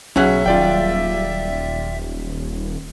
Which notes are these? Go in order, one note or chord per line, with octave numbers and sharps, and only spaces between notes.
B1 F#3 C#4 G#4 E5 F#5
D#1 F4 D5 G5